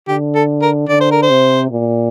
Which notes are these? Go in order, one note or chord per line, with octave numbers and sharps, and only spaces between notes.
D3 G4
A4
A#4
D3 D5
C5
A#4
C5
C3
A#2